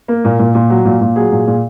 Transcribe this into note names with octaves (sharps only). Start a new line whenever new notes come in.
A#3
A#2
A#2
A#2
F#3
A#2
A#2
F#3 G#4
A#2
A#2